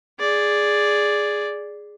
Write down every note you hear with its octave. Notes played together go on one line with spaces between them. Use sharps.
G#4 D5